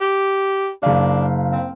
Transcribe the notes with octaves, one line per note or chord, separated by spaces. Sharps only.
G4
F#1 D4 F5
C4